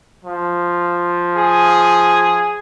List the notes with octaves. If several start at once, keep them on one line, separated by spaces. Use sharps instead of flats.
F3
G#4